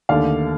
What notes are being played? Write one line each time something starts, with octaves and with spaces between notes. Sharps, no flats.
D#2 D3 A3 D5 F5